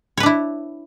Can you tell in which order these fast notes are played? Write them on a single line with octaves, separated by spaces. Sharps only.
C#5 B4 D4 E4